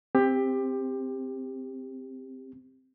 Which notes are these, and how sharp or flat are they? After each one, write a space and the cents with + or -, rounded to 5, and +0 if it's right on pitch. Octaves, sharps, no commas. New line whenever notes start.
C4 +0 G4 +20